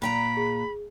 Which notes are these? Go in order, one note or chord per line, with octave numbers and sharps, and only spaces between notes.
A#2 G5 A#5 B5
G#4